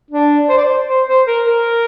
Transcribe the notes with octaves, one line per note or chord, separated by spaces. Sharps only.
D4
C5
D5
C5
C5
C5
A#4
A#4